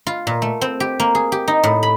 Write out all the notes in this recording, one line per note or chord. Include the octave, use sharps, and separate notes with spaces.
F4
A#2
A3
C4
G4
A#3
G#4
G4
D#4
A2
B5